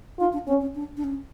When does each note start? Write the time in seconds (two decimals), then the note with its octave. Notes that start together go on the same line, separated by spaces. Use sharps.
0.20 D#4 F4
0.33 D4
0.48 C4 C#4
0.62 C#4
0.75 D4
0.97 D4
1.04 C#4